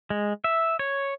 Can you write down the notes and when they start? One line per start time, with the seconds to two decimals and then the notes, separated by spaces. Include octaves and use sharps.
0.10 G#3
0.44 E5
0.79 C#5